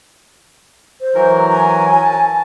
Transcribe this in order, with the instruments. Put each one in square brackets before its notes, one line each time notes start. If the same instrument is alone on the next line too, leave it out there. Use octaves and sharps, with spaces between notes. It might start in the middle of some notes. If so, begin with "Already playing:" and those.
[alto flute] C5
[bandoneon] E3 F#3 A#4
[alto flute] G#5
[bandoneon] A5